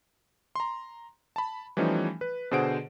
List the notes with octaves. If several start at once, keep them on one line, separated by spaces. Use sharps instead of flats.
A#5 C6
A5 B5
E3 F3 G3 A3 C#4 D#4
B4
B2 D3 G#4 C5 F#5 D7